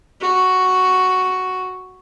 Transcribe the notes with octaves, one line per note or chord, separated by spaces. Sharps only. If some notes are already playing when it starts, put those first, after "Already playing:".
F#4